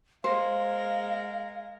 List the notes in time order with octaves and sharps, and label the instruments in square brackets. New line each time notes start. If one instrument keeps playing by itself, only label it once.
[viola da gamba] G#3 A#4 [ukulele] C5 [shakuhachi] F5